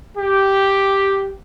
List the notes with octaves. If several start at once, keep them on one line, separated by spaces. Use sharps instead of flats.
G4